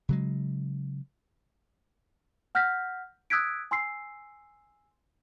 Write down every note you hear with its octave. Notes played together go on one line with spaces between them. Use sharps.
C#3 F#3 G#3
F#5 F6 G6 A#6 B6
D#6 E6 F#6 G#6 B6 D7
G#5 C6 E6 C7